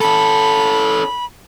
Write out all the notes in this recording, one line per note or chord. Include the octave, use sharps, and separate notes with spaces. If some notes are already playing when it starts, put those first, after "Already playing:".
C#4 A4 B5